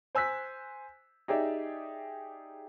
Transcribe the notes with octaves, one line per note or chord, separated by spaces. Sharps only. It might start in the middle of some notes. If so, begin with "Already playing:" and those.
C5 G#5 E6 F#6 B6
D#4 G4 G#4 D5 E5